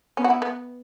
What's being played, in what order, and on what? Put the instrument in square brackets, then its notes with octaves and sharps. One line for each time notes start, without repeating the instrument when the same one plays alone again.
[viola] B3 [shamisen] C#4
[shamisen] F#4
E4
B3